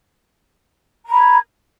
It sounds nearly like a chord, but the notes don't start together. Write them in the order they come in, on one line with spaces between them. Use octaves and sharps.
A#5 B5 G#6